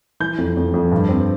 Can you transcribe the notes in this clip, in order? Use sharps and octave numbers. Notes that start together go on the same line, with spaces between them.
E3 G6
F2
F2
F2
G2
C4